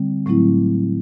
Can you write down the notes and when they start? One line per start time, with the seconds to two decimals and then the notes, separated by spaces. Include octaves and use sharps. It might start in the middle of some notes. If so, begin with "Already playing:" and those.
Already playing: D3 G3 C4
0.26 A2 F#3 A3 C4 E4